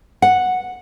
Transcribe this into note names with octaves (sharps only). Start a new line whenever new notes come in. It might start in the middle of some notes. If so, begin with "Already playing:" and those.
F#5